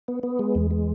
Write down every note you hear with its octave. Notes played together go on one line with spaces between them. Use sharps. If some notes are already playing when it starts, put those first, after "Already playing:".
B3
B3
G#3
E2
G#3